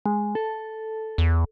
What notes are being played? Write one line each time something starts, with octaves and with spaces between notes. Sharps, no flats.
G#3
A4
E2